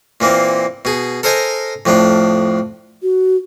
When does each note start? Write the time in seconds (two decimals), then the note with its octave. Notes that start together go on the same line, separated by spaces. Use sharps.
0.20 A#2 E3 A#3 C4
0.85 B2 G#4
1.23 A4 A#4 C5 D#5 G#5 A#5
1.85 F2 A2 F3 D4
3.03 F#4